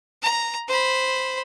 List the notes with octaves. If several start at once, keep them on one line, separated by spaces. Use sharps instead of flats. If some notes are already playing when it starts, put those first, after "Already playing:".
A#5
C5 B5